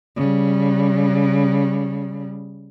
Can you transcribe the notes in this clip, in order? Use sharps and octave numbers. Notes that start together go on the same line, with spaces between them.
C#3 G3